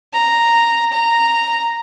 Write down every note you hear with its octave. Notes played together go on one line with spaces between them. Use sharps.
A#5
A#5